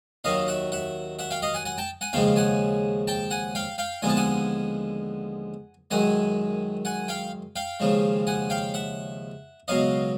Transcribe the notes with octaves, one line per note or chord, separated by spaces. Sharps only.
D#2 D#3 F#3 D#5 F5
E5 F#5
E5 F#5
E5 F#5
F5 G5
D#5 F5
F#5 G#5
F#5 G#5
G5 A5
F#5 G#5
D#2 C#3 F3 G#3 F5 G5
F#5 G#5
G5 A5
F#5 G#5
F5 G5
F5 G5
D#2 D3 F3 G#3 B3 G#5
A5
F#5 G#5
F#2 D#3 G#3 F#5 G#5
F#5 G#5
F5 G5
F5 G5
D#2 C#3 F3 G#3
F#5 G#5
F5 G5
E5 F#5
C#2 B2 F#3 D#5 F5